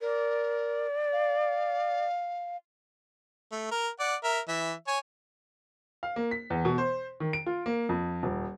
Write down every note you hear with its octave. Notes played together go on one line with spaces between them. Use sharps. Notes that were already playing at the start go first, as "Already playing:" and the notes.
A#4 D5
F5
A3
A#4
D5 F#5
A#4 E5
E3 E5
C#5 G#5
F5
A#3
B6
E2
B2
C5
D#3
D7
F4
A#3
F2
D#1